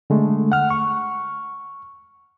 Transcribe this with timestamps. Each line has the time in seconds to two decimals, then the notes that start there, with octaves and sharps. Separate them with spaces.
0.10 D3 G#3 A3
0.52 F#5 F6
0.70 C#6